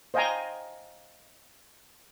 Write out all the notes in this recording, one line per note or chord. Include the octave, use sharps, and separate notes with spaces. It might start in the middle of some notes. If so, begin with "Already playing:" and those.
C5 D#5 F5 G5 G#5 A#5